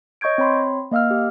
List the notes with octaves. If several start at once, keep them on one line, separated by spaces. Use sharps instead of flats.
C#5 D#5 C#6 G6 G#6 D7
C4 C#5 B5 C6
A#3 D#5 F5 E6 F6
G4